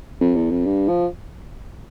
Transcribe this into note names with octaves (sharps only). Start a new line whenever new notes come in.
F2
E2
F2
G2
F3